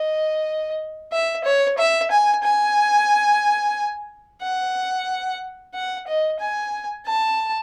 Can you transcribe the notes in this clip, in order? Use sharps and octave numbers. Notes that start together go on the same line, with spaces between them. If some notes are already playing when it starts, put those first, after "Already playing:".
Already playing: D#5
E5
C#5
E5
G#5
G#5
F#5
F#5
D#5
G#5
A5